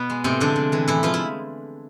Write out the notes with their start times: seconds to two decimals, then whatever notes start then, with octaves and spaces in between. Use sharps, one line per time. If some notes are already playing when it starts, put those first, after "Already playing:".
Already playing: B2 B3
0.10 G#3
0.24 A2 C3 C4
0.40 D3 F3 G#3 D4
0.56 C3
0.72 E3 G#3
0.88 A2 E3 E4
1.03 E3 F3 G#3 F4
1.14 E4